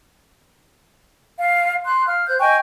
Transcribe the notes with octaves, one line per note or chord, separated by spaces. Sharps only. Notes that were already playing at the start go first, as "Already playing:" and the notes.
F5
C6 F#6
F5 F6
C5 F#6 G6
D#5 G5 G#5 C#6